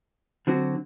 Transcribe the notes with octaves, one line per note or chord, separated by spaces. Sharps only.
D3 F#3 C4 F#4